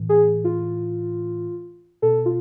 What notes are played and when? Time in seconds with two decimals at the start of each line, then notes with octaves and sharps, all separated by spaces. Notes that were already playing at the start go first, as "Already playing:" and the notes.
Already playing: A2 E3
0.09 G#4
0.44 F4
2.02 B2 A4
2.26 F4